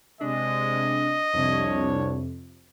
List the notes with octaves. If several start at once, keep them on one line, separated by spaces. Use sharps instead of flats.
C3 G#3 D4 D#5
C2 F2 C3 D4 C#5